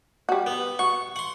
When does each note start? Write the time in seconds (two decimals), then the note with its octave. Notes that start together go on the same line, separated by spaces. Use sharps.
0.29 G3 F#4
0.47 B3
0.79 F#4 C#6
1.16 F#5 C6